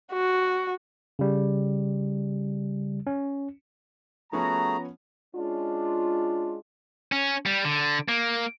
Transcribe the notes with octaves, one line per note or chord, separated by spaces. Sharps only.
F#4
C#3 G3
C#4
F3 A3 B3 C#4 F#4 G#4 A#5
G#3 C#4 D4 F4
C#4
G3
D3
A#3